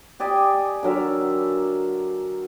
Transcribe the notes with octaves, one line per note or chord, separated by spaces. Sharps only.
G4 D5 D#5 G#5
D3 F#3 A#4 E5